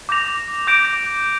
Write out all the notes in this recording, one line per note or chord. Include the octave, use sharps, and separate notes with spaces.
D6 G6 A#6 F7
D6 G6 A#6 D7